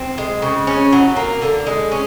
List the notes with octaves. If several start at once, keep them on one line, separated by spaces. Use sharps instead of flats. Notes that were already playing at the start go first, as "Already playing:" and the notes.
Already playing: C4
G#3
C#3
C#4
F#3
A#3
D3
G#3
C#4